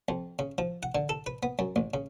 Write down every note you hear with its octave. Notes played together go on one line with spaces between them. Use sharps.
F2
C#3
F3
F#5
D3
A4
B4
B3
F#2
A1
C#3